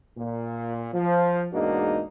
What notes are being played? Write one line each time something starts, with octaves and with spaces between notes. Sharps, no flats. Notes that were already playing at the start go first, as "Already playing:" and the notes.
A#2
F3
E2 G#2 A#3 D4 D#4 F#4